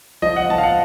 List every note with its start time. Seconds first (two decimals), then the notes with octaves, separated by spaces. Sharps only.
0.22 F3 D#5
0.36 F#5
0.49 F3 A5
0.58 F5
0.63 F#5